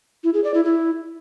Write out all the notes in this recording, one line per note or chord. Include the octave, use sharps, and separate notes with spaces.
E4
G#4
D5
E4
E4